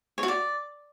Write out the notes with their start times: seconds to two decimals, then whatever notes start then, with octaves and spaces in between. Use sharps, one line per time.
0.18 C#5
0.23 F#4
0.28 D5